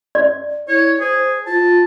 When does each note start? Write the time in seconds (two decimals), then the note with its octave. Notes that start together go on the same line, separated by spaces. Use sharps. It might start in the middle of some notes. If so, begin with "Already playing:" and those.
0.15 D5
0.68 E4 C#5
1.00 G#4 C5
1.46 F4 A5